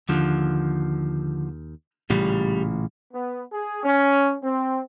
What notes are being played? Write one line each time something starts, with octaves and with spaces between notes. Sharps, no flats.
D#2 D3 F3
A1 A#2 C#3 G3
B3
G#4
C#4
C4